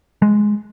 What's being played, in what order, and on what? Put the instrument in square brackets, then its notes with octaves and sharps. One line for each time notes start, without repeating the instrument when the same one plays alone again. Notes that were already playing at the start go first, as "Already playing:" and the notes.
[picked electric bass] G#3